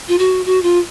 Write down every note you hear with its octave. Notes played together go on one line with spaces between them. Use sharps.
F4
F#4
F#4
F4